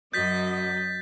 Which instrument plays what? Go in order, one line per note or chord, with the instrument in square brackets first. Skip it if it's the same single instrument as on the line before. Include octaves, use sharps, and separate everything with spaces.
[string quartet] F#2 [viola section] F#3 D#5 [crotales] G6 A6 B6